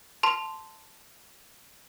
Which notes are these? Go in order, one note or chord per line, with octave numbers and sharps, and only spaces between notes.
A5 C6